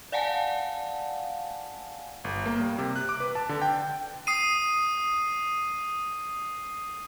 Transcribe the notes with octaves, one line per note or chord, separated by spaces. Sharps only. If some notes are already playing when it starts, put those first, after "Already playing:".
D5 F5 F#5 G#5 A5
G1
A#3
G3
C3
F#6
D6
B4
A5
D3
G5
D#6 C7 D#7